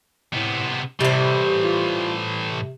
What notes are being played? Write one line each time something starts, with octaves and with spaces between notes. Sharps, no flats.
A2 C3 B3
A2 C3 E3 G3 C5
F4
C3